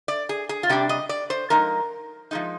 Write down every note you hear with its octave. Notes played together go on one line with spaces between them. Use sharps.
D5
G#4
G#4
F4
C3 G3 D4 G4
D#5
D5
C5
F3 G#3 D#4 A#4
F3 G#3 D#4